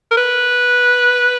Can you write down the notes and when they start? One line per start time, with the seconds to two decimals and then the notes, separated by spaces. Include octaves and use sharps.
0.11 A#4
0.17 B4